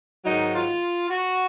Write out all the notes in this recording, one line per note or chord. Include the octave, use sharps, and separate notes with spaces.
G#2 D#3 F#3 D#4
F4
F#4